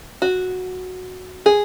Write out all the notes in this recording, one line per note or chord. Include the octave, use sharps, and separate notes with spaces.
F#4
G#4